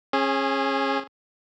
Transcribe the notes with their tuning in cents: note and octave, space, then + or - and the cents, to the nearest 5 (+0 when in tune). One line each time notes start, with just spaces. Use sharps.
C#4 -30 G#4 +0